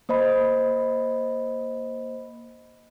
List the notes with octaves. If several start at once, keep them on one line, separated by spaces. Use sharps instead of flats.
A#3 C5 D#5 B5